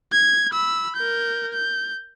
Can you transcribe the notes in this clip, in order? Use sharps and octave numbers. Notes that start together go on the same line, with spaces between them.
G#6
B5 E6
A#4 G6
G6